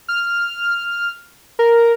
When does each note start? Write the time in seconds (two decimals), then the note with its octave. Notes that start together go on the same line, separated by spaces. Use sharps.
0.08 F6
1.59 A#4